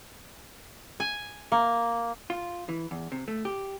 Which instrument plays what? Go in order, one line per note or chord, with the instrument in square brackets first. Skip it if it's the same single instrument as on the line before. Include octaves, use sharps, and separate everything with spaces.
[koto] G#5
A#3
[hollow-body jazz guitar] F4
E3
E2
C3
A3
G4